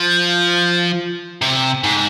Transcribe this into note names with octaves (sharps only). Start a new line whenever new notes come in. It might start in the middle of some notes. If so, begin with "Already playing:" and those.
Already playing: F3
C3
G#2